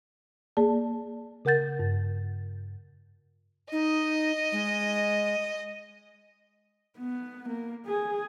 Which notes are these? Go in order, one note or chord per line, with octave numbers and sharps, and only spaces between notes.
A#3 G#4 D5 A5
C#3 A#4 F#5 G6 A6
G2
D#4 D#5
G#3
B3
A#3
G#4